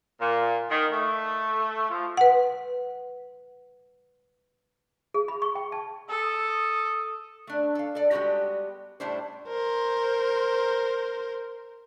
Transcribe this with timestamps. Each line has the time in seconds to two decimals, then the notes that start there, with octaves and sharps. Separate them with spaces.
0.21 A#2
0.69 D#3
0.91 A3
1.90 F3
2.17 B4 F#5
5.14 G#4
5.28 B5
5.42 C#6
5.55 G5
5.72 A5
6.09 A4 D#6
7.47 A3 D4
7.75 A4 F5
7.95 A4 D5
8.11 G3 G#3 B3 D#4 F#4 G4
9.00 A2 G3 A3 D4 E4 C5
9.48 A#4 C5